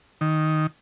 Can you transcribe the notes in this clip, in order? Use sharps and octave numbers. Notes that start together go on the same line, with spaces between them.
D#3